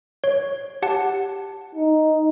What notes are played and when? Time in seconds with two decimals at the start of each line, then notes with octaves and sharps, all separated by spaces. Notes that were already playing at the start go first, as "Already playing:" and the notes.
0.24 C#5
0.82 G4 F#5 A5
1.75 D#4